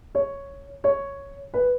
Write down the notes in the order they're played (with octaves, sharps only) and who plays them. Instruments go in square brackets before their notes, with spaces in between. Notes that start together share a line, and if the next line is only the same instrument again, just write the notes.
[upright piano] C#5
C#5
B4